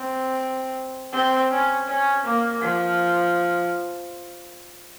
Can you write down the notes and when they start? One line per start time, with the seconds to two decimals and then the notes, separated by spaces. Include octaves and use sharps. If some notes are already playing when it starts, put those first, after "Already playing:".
Already playing: C4
1.13 C4
1.51 C#4
1.88 C#4
2.24 A#3
2.61 F3